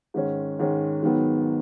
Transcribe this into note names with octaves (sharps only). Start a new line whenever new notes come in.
G#2 D#3 G#3 C#4
G#2 D#3 G#3 C#4
G#2 D#3 F#3 B3